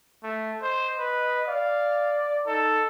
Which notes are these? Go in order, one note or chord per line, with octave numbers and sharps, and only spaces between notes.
A3
C5 D#5
B4
D5 F5
D#4 A4